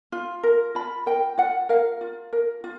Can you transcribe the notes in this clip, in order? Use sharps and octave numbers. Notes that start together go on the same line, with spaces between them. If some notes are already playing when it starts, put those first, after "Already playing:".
F4
A#4
F4 B5
A#4 G5
F4 F#5
A#4 F5
F4
A#4
F4